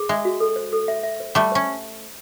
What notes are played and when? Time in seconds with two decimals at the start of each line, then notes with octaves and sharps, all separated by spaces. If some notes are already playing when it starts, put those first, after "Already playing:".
Already playing: G#4
0.09 G#3 E5
0.25 F#4
0.40 A4
0.56 C5
0.73 A4
0.88 E5
1.03 E5
1.20 C5
1.35 G3 A3 C#6
1.52 C#4 C5